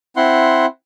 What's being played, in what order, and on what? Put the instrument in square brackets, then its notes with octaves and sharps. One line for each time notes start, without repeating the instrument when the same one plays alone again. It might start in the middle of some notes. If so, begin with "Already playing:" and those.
[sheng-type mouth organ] C4 E4 F#5 C6